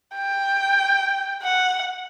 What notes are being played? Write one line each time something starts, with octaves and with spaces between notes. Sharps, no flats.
G5
F#5